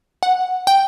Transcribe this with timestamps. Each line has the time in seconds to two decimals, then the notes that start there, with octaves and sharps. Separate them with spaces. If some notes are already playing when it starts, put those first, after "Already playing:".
0.23 F#5
0.67 G5